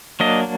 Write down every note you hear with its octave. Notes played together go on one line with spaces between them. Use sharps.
F#3 A#3 D4 D#5